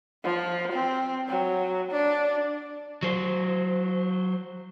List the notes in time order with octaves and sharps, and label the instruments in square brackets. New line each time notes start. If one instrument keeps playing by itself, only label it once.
[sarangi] F3
C4
F#3
D4
[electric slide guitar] F#3 C5